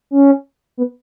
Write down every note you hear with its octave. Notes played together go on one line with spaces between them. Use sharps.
C#4
B3